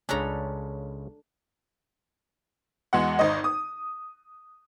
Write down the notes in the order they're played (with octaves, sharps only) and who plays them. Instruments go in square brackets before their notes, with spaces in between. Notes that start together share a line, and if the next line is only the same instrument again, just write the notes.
[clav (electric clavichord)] C#2 C#3 C#4 [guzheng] D4 A4 A#5
[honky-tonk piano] E2 G#3 F#4 F#5
G#1 D#4 C5 D#5
D#6